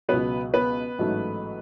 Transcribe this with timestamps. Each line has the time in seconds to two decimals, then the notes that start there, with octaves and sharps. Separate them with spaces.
0.09 C#2 B2 F#3 B3 B4
0.54 B3 B4
0.99 A1 G#2 F#3 A3